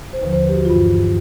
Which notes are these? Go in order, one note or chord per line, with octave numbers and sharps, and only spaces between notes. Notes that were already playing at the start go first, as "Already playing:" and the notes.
C5
D#2 D3 F3 B4
C5
B4
G4
F#4
G2 E3 F4